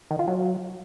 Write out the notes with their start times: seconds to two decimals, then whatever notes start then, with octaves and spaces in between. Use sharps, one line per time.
0.11 D#3
0.19 F4
0.28 F#3